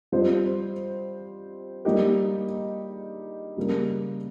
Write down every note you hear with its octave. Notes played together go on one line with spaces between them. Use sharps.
G3 C4 F4 C5 D#5
G3 A#3 D#4 G4 A#4
C#3 G3 A#3